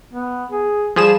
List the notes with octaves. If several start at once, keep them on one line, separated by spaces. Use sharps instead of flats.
B3
G#4
F3 G3 G#4 E7